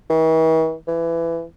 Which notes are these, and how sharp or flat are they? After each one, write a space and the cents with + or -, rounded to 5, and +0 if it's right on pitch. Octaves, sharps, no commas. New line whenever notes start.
E3 -45
E3 +20